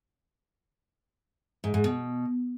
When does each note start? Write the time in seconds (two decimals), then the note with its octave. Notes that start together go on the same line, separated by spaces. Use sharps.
1.64 G#2
1.74 G#2
1.84 B2